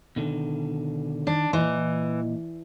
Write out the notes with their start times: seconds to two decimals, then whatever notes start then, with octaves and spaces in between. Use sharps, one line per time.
0.16 B2 D3 D#3
1.27 D#3 D4
1.53 A#2 E3 D#5 C6